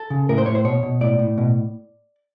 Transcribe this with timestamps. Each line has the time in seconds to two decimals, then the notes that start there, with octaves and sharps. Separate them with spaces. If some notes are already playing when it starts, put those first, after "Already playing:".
Already playing: A4
0.10 C#3
0.29 A2 A#4
0.38 C5
0.46 A2 C#5
0.55 C5
0.65 B2 C#5
0.83 B2
1.01 A2 D5
1.19 A2
1.38 B2